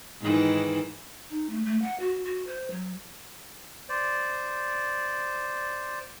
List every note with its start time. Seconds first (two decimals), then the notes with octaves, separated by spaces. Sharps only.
0.21 G#2 D#3 E3
1.30 D#4
1.50 A3
1.65 A3
1.82 F#5
2.00 F#4
2.25 F#4
2.47 C5
2.71 F#3
3.89 C5 D5